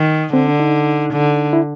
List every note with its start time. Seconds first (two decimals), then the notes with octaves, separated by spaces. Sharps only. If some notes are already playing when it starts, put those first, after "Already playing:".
Already playing: D#3
0.33 D3 C4
0.47 D4
0.60 D#4
1.13 D3
1.53 E4